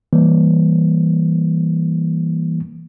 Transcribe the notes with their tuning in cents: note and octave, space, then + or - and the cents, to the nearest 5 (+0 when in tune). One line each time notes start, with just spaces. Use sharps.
E3 +0 G3 +5 A#3 +0